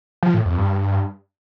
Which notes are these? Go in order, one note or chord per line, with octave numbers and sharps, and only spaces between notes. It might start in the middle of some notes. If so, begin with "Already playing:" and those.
F3
A2
F2
G2